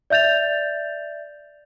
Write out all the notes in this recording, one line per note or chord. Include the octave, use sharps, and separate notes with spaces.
D5 E5 G6 A6 F7